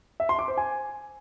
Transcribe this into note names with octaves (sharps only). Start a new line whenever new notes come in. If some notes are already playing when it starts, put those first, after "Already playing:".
E5
C6
D6
C5
G#5